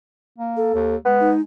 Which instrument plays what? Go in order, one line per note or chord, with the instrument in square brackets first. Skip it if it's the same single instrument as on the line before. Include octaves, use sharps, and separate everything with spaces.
[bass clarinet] A#3
[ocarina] A4
[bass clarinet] D#2
[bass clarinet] G#3 [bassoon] B3
[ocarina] D#4